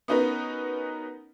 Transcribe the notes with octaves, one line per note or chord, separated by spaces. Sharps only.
B3 C#4 D#4 F#4 A#4 B4